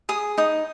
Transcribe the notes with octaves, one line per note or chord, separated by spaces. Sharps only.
G#4 D#6
D#4 D#6